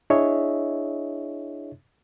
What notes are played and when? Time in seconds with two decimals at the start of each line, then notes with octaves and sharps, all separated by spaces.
0.10 D4 E4 G#4 C#5 D#5 E5